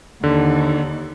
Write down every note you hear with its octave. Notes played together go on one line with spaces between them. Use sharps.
D#2 D3